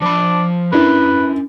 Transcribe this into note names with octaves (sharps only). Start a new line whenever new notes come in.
F3 D4 B5
C#4 D4 E4 A#4 B4